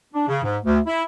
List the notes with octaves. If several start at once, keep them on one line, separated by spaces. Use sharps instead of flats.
D4
C#3
G#2
D2
E4